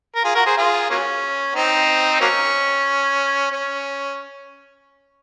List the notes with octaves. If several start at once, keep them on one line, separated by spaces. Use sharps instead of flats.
A#4
F4 G#4
F#4 A#4
G#4 C5
F4 G#4
F#3 A#3 C#4
C4 D#4
F#3 A#3 C#4
C#4